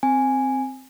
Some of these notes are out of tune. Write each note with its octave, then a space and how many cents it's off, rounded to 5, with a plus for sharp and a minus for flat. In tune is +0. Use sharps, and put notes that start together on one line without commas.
C4 +0 G#5 +0